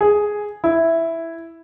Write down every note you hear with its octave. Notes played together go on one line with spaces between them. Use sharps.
G#4
E4